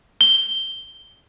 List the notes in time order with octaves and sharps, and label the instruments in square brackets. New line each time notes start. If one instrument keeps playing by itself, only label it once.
[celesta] G7